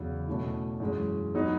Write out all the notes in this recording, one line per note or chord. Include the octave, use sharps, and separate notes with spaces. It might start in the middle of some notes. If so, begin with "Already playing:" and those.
Already playing: E2 C#3 F#3
B2 A3 C#4 E4
F#2 E3 G#3 C#4
F#3 B3 D#4